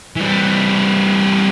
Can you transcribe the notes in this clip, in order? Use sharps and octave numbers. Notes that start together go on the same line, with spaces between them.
E3 G3